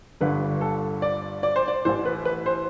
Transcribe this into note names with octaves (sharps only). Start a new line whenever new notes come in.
G1 G2 D3 B4
A4
D5
D5
C5
D5
A1 A2 E3 C5
B4
B4
C5